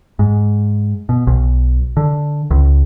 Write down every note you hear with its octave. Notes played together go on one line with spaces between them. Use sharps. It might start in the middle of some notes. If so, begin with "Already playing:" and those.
G#2
B2
B1
D3
C#2